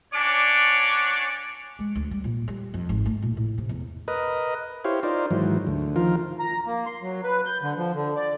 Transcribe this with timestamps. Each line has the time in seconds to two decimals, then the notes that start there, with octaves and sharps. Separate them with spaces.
0.13 C#4 D4 F#4 C#5 D5 D6
1.79 G#3
1.95 D2
2.11 G3
2.24 A#2
2.48 G3
2.74 F2
2.89 G#1
3.06 A3
3.22 A#2
3.37 A2
3.58 C3
3.69 E2
4.08 A#4 B4 D#5
4.85 E4 G4 C5 C#5 F5
5.03 D#4 F4 A#4 C5 D5
5.31 G#2 D#3 E3 F#3
5.67 D2
5.96 D#3 F3 F4 A#4
6.39 A#5
6.66 A#3
6.86 C6
7.02 F#3
7.24 B4
7.46 G6
7.62 D3
7.77 F3
7.95 D3
8.16 D5